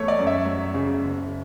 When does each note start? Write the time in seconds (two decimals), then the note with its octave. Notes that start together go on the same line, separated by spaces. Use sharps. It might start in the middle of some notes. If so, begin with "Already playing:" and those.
Already playing: E2 A3 C#5
0.08 D5
0.19 F#2
0.27 E5
0.46 F#3
0.74 C#3
1.03 F#1